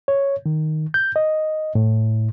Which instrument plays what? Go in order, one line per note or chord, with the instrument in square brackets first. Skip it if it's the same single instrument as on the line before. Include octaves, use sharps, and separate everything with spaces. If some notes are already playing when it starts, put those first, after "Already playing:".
[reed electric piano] C#5
D#3
G6
D#5
A2